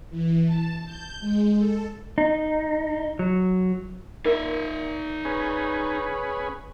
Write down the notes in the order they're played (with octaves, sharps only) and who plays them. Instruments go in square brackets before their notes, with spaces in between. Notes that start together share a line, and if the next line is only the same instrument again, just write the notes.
[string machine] E3
A5
G6
G#3
A4
[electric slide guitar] D#4
F#3
[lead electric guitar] D#4 E5 [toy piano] A#4
[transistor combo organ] C#4 G#4 B4